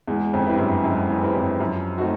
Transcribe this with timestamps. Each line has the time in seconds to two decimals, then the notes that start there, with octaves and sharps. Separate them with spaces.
0.07 E2 G#3
0.34 F2
0.46 C4 E4 G4 B4
0.54 G2
0.58 F#2
0.84 F#2 G#3
1.09 E2
1.22 C4 E4 G4 B4
1.35 F2
1.60 F#2 F3
1.98 A3 C4 D#4 F#4